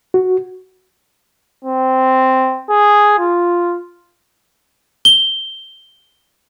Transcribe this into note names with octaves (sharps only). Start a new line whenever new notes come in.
F#4
C4
G#4
F4
G7